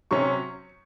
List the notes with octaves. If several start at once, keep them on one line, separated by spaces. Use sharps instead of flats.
C3 F#3 C#4 C#6